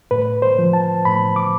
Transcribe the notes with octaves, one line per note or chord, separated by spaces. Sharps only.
A2 B4
C5
F3
A5
A2 B5
D6